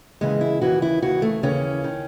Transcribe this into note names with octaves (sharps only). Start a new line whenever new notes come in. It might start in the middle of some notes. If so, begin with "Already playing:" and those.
D#2 C#3 E3 G#3
E4
D#2 C#3 E3 F#4
E4
D#2 C#3 E3 F#4
A3
D#2 C#3 E3 C#4
D#3